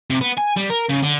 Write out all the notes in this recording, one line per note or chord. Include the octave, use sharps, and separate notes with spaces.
C3
B3
G#5
G3
A#4
C#3
D3